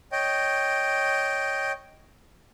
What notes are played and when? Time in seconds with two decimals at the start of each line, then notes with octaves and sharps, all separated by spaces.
0.12 C#5 D#5 G5